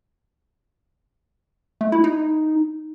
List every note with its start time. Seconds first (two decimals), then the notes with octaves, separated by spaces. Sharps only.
1.81 A3
1.92 E4
2.04 D#4